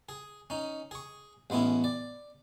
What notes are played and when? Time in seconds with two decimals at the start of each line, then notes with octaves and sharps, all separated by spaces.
0.09 G#4
0.50 C#4 D#4
0.91 G#4 C#6
1.50 A1 G#3 B3 C#4 E4
1.84 D5